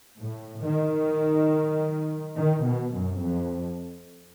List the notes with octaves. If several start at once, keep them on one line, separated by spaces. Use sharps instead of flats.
A2
D#3
D#3
B2
F#2
F2